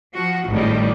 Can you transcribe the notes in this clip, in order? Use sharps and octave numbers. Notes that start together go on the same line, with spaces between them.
F3 F#4
G#1 A2 D#3 G3